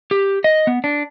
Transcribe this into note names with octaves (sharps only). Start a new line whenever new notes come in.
G4
D#5
B3
D4